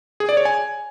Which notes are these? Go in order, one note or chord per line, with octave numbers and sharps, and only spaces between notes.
G#4
D5
C#5
G#5